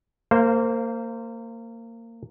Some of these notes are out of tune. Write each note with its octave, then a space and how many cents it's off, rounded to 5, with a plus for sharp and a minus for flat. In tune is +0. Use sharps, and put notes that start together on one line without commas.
A#3 -25 C5 +0 F5 +0